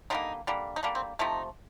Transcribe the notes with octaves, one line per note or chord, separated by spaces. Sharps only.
D3 G3 A#3 D#4
D3 G3 A#3
D#4
D3 G3 A#3 D4
C4
C3 F3 A3 D#4